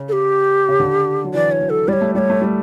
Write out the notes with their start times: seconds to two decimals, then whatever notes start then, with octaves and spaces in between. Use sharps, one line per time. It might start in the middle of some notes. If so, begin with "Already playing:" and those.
Already playing: C#3
0.09 A4
0.12 G4
0.69 C#3
0.80 D3
1.24 F#3
1.34 E3 D5
1.52 C#5
1.61 F#3
1.70 A4
1.88 G3 D5
1.93 C#5
2.01 A3
2.15 G3 D5
2.18 C#5
2.30 A3
2.42 G3